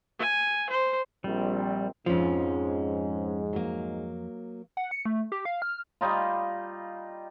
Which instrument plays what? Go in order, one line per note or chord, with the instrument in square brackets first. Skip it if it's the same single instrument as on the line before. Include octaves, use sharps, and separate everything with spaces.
[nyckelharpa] G#5
C5
[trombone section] A#1 C4 [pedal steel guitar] G3
[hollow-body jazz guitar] F2 F3 [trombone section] G#2 G#3 [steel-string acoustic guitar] C4 C#4
[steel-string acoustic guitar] F#3 A#3
[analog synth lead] F#5
C#7
A3
G4
F5
F6
[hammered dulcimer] G3 D#4 F4